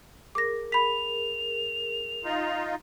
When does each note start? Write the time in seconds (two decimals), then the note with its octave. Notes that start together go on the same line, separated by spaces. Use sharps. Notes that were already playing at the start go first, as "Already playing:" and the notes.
0.35 G#4 A#4 D6 A#6
0.72 B5 B6 F7
2.24 D#4 F4